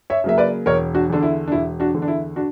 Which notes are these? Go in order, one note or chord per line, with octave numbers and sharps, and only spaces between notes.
C#5 E5
C#3 F#3 A#3 E5
B4 D5
E1 A#4 C#5
D4 F#4
E2 D3 D4
E4
D4
E1 E4
D4 F#4
E2 D3
D4
E4
D4 F#4